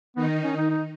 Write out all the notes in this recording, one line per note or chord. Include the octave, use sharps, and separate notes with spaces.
D#3 B3 D#4
C#4
D#4
D#4